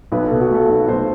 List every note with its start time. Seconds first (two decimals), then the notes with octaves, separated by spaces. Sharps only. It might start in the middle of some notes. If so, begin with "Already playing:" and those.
0.12 B1 B4
0.26 A4
0.31 B2
0.41 F#4
0.50 A3 A4
0.70 B1
0.88 B1 C5